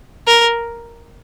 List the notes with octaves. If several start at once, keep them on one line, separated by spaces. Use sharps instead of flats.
A#4